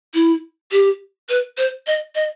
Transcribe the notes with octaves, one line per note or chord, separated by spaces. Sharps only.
E4
G4
B4
C5
D#5
D#5